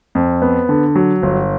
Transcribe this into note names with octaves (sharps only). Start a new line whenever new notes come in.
F2
B3
D3
F#3
G1